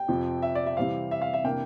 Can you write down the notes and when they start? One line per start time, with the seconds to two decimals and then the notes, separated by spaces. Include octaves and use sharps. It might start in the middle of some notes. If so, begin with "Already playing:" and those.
Already playing: G5
0.08 F2 C3 F3
0.42 E5
0.55 D5
0.66 E5
0.77 C3 E3 G3 C4 E4 F5
1.11 E5
1.22 F5
1.33 E5
1.44 C3 E3 A#3 D4 G5